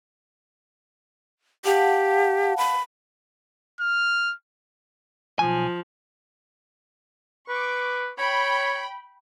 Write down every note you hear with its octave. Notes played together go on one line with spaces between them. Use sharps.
G4 F5 F#5 A5
B5
F6
B1 F3 G#5
B4 C#6 D6
C#5 G5 B5